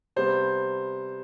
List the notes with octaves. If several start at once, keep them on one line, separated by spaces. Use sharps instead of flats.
C3 G3 B3 C5